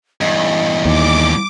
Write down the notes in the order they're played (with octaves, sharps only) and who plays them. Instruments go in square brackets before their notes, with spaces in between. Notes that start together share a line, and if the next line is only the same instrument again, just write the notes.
[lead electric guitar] E2 G2 [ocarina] D#5
[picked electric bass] D#2 [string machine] D6